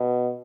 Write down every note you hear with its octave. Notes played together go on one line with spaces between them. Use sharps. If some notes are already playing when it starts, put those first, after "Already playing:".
Already playing: B2